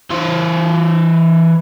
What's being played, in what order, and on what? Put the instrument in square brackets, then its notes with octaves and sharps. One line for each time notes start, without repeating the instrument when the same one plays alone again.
[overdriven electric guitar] E3 C5